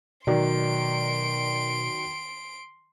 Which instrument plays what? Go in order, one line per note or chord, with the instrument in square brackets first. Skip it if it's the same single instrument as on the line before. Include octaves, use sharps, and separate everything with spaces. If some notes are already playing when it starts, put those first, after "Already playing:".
[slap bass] B2 [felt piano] D#3 F#3 D5 [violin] C6 D7